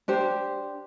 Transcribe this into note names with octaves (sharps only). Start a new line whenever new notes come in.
D4 G4 C5